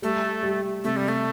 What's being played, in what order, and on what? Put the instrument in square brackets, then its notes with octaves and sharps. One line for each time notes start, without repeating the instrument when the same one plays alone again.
[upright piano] G3 [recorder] A3
[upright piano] G3
[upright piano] C3 [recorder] A3
[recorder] G3
A3